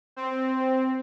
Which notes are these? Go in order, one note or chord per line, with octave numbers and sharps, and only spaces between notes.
C4